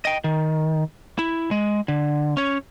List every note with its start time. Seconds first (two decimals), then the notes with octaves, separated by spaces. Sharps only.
0.05 D#5 G5
0.24 D#3
1.19 E4
1.51 G#3
1.88 D3
2.37 C#4 C#5